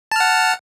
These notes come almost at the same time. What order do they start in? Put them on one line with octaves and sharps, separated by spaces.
A5 F6 F#5